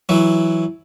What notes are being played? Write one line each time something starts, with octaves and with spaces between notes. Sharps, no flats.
E3 F#3